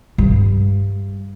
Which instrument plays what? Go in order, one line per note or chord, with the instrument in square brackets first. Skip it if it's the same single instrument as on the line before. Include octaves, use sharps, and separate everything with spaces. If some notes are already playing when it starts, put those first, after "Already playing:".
[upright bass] G2